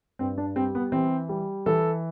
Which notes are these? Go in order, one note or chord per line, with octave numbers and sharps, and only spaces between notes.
G2 C4
D4
G3 C4
B3
E3 C4
G3
E3 A4